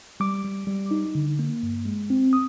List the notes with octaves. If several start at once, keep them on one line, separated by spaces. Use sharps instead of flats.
G3 D6
G3
G3
D#4
D3
A#3
G2
G#3
C4
D#6